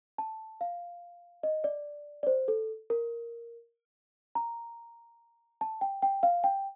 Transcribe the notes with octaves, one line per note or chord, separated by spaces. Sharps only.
A5
F5
D#5
D5
D5
C5
A4
A#4
A#5
A5
G5
G5
F5
G5